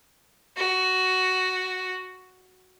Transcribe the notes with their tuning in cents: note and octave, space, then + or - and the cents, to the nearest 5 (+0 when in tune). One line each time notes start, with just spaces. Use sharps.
F#4 +5